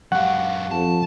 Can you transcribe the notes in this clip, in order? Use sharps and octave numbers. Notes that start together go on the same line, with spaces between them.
F#2 G4 F5 F#5 C#6
F2 A5